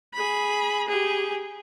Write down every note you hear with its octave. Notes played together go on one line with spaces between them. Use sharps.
G#4 B5
G4 G#4